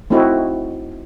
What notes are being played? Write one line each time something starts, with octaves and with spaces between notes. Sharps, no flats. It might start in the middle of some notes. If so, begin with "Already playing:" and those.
A3 C4 D#4 E4 F#4